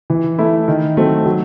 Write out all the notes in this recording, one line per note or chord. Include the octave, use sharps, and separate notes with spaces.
E3
A3 E4
D#3
F#3 A3 C4
F#3